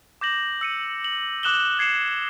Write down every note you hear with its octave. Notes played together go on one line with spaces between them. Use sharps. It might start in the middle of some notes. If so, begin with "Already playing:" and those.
D6 G6 A#6 F#7
E6 C#7 D#7
F#7
D6 D#6 F#6 E7 F#7 G7
F#6 G#6 C7 C#7 E7